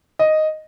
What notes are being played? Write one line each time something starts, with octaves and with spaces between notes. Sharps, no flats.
D#5